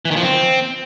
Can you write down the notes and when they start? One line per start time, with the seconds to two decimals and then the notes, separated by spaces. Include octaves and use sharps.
0.05 E3
0.11 D#3
0.16 F3
0.22 C4